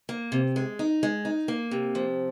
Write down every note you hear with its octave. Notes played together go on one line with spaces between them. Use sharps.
A#3
C3
G#3
D#4
G#3
D#4
A#3
C3
F3